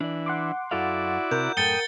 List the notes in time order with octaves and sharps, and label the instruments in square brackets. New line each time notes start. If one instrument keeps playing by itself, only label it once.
[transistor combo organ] E3 [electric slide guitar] D4 D5
[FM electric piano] F#5 C6 D6
[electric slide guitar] F#2 A4 F5 [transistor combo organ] E4 F#4 D5
[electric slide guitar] C3 [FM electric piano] A#4 F#5 [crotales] G6
[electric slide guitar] F#2 A2 A4 [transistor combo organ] G5 D#6 [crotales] A6 C#7 G7